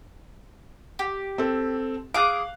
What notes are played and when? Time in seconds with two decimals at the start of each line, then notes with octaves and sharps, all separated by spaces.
0.99 G4
1.38 C4 A4
2.14 G#4 F5 D6 F#6